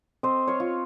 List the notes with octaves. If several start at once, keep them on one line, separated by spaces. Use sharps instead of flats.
C4 C5 D#5
C#5 F5
F4